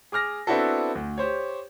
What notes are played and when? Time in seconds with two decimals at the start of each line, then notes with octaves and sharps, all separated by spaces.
0.12 G#4 D6 F6 A#6
0.47 B3 C4 D4 E4 F#4 A4
0.95 D2
1.18 G4 C5 C#5